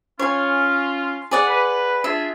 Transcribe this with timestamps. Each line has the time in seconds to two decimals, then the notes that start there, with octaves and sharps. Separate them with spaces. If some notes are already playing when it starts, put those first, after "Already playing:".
0.19 C#4 F4 C#5 G#5
1.31 G#4 D5 F#5
1.47 B4
2.04 D4 F4 G#4 E5